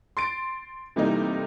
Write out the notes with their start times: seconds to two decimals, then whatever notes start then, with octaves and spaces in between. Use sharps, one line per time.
0.17 C6 A6 D7
0.96 C3 E3 G3 A3 A#3 D#4